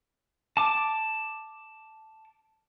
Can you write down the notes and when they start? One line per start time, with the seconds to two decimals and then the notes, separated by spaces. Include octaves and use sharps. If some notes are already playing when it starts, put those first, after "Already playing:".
0.57 A5 D6